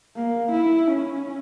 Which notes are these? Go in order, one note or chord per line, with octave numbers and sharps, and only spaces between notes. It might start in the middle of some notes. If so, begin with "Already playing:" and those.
A#3
E4
C#4